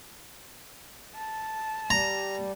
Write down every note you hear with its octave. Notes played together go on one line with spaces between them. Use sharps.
A5
G3 A#5